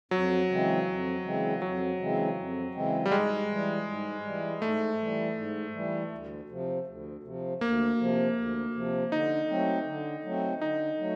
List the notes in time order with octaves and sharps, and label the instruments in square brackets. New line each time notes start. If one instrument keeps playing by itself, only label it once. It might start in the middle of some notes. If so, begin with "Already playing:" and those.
[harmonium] F2 [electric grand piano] F#3
[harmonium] C#3 E3 G#3 C4
F2
C#3 E3 G#3 C4
[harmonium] F2 [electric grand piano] F#3
[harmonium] C#3 E3 G#3 C4
F2
C#3 E3 G#3 C4
[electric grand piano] G3
[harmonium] G#2 [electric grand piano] G#3
[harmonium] E3 G3
G#2
E3 G3
[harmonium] G#2 [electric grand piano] A3
[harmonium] E3 G3
G#2
E3 G3
D2
C3 F3
D2
C3 F3
[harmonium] D2 [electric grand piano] A#3
[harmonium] C3 F3
D2
C3 F3
[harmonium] D3 [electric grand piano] D#4
[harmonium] F#3 A3 C4
D3
F#3 A3 C4
[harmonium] D3 [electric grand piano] D#4
[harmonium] F#3 A3